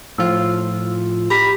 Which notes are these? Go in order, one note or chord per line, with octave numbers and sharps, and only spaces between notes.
A2 F3 F4 E6
G4 A#5 B5 B6